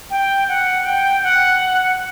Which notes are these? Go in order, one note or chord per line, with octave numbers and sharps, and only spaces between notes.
G5
F#5
G5
F#5